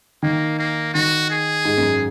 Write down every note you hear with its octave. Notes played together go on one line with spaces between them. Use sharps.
D#3 A#3
A#3
D#3 F#4
G#4
G#2
F#2